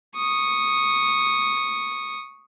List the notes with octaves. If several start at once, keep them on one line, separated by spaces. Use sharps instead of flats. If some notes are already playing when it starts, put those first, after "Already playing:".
C#6 D#6